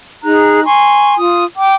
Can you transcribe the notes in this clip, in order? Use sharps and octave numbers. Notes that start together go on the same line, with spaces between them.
D#4 G#4 A#5 F#6
G#5 C6 C#6
F4 D#6
G5 D6